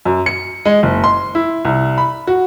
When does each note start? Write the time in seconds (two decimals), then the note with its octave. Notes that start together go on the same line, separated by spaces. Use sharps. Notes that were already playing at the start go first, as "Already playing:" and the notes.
0.05 F#2
0.26 C#7
0.65 G#3
0.83 F#1
1.04 C6
1.35 E4
1.65 C2
1.98 B5
2.27 F#4